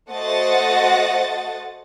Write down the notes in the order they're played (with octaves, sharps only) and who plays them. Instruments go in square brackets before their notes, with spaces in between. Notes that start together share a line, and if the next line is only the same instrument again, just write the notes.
[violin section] A3 F#4 C5 D#5 F#5 A6